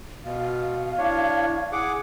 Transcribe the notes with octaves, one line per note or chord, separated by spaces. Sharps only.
B2 F5
D4 E4 C#5
G#4 F#5 D6